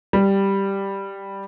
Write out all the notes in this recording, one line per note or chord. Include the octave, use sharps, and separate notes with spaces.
G3